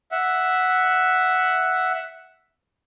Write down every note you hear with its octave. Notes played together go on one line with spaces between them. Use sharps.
E5 F#5